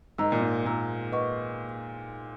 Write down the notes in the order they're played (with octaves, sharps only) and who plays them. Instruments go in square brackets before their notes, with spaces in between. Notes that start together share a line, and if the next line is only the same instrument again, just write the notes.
[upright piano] G#2 [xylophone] A#4 D#5 A#5 E6
[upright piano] A#2
G#2
[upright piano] A#2 [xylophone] A#4 D#5 A#5 E6
[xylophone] B4 D#5 F#5 C#6